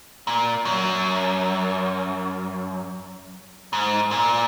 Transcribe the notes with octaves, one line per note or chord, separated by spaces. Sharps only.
A#2
F#2
G#2
A#2